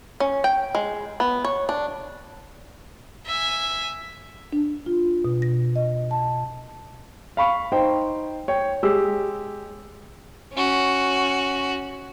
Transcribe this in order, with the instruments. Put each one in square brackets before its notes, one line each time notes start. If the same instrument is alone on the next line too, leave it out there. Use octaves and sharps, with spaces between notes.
[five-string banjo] C#4
G5
G#3
B3
C#5
D4
[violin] E5 G#5
[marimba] D4
F4
B2
A#6
D#5
A5
[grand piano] F5 B5 C#6
D#4 C5 G5
C#5 G5
G#3 G4 E6
[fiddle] C#4 F#4